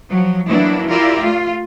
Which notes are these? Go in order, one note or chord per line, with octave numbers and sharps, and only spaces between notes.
F3 F#3
E3 F#3 A#3 B3 D4 E4
E4 F4 G4 A#4 D5 E5
A3 F4